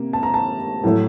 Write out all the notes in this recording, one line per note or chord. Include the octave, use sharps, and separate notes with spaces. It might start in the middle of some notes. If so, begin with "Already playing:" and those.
Already playing: C3 A#3
A5
A#5
A5
A2 F#3 A3